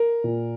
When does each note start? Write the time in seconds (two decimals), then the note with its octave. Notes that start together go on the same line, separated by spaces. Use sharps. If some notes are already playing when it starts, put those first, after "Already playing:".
Already playing: A#4
0.24 A#2